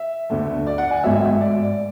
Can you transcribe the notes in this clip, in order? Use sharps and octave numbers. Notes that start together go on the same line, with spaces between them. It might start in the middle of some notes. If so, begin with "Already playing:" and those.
Already playing: E5
D2 D3 A3
D5
F#5
G#5
G#1 G#2 F#3 A3 E5
D5